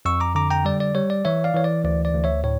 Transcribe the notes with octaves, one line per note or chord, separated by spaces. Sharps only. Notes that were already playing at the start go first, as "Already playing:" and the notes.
F2 C#6 E6
A#5 D6
D3 A#5 D6
G5 A#5
G3 D5
D5
G3 C#5
D5
E3 C#5 E5
D5 F5
E3 C#5
D5
D2 D5
D5
D2
C#5 E5
A2 C#5